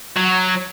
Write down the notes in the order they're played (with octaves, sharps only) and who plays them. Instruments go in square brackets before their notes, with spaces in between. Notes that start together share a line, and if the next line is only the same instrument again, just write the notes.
[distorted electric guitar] F#3